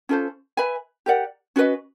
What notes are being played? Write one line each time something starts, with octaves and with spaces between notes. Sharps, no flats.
C#4 F4 A4 C5
B4 E5 G#5 B5
G4 A#4 D5 F#5
C#4 F#4 B4 D#5